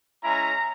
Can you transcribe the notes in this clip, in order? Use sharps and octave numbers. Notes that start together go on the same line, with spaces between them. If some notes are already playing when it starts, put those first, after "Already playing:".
G#3 C#4 E4 A#5